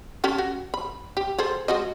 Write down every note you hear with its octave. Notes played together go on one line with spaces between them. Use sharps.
C#4 G4 A4
F#4
B5
G4
G#4 A4 C5
G#3 F#4 D#5